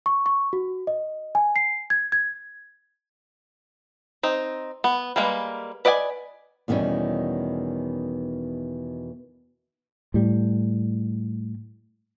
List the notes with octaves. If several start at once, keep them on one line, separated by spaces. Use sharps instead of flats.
C#6
C#6
F#4
D#5
G#5
C7
G#6
G#6
C4 D#4
B3
G3 G#3 A#3 B4
B4 D5 D#5 F#5 G#5
E2 B2 D#3 G3 C#4
A2 G3